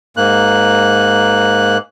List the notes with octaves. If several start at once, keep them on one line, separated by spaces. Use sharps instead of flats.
G#2 A#3 F#6